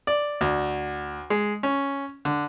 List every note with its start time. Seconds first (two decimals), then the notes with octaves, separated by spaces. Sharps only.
0.07 D5
0.41 D2
1.30 G#3
1.63 C#4
2.25 D3